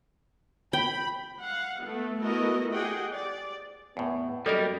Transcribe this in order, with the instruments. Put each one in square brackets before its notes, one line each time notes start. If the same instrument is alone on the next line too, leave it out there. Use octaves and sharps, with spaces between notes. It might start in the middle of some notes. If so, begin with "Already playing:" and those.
[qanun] G5 [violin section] B5
[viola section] F5 F#5
A3 B3
A3 B3 E4 F#4 A#4 D#5
G4 G#4 D#5 F#5 G5
D5
[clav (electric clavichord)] E2 A2 [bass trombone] B3
[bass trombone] F#2 [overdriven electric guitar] G3 [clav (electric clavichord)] A#3 A#4 [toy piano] A4 D#5